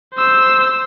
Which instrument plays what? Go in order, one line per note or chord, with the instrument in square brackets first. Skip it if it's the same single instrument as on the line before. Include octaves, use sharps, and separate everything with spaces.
[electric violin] C5 E6